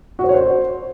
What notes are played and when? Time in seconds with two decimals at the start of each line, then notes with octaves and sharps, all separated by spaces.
0.19 F#4
0.24 C5
0.29 C#5
0.34 C5